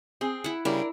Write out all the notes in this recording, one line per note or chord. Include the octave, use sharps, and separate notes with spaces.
C4 G#4
E4 F#5
C#3 G3 D4 E4 A#4